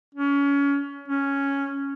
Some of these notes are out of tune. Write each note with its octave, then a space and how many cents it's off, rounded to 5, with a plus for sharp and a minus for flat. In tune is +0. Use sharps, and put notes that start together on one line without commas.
C#4 +25
C#4 +0